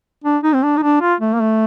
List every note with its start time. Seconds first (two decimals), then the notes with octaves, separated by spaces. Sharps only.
0.24 D4
0.43 D#4
0.53 C4
0.63 D4
0.77 D#4
0.83 D4
1.01 F4
1.20 A3
1.34 A#3
1.41 A3